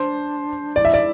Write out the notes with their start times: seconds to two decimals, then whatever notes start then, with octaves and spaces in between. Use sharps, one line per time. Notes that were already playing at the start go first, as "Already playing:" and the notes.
Already playing: D4 C5
0.76 E4 D5
0.85 E5
0.94 D5